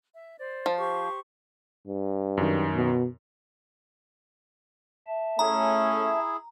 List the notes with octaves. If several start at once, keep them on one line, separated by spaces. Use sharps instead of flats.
E5
C5 D5
F3
G4 C5 C#6
G2
F#2 D#3
B2
E5 A5
A3 C#4 E4 G#4 A#5